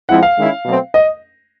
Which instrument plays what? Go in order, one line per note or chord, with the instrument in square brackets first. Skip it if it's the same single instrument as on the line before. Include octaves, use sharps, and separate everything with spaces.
[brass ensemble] F3 G#3 C4 E4 [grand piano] F#5
[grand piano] F5
[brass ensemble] D#3 G#3 C#4 E4
B2 F#3 A3 C4
[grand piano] D#5